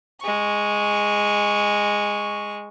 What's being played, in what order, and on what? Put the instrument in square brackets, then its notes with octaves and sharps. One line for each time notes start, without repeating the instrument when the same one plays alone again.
[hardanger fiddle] G#3 C#6